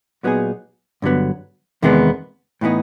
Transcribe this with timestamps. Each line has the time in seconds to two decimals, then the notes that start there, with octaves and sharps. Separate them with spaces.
0.23 A#2 F#3 B3 D#4 G#4
1.02 G2 D3 F#3 B3
1.82 E2 C3 D#3 G#3 B3
2.61 A2 E3 G#3 B3 D#4